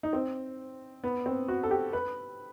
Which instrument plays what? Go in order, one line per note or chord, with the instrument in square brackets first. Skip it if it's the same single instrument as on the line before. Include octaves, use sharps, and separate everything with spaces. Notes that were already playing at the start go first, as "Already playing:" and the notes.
[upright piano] D#4
C4
B3
C4
F#4
A4
G4
B4